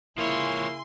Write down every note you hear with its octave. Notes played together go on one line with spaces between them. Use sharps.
C#3 F3 A#3 E4 C#5 G#5 C6